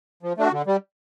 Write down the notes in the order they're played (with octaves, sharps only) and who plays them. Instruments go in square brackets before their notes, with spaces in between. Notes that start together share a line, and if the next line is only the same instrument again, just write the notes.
[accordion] F3
A3 D4 F#4
D3
G3